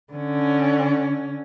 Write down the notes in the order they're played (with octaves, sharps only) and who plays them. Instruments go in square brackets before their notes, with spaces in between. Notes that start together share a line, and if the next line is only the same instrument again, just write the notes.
[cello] D3 C#4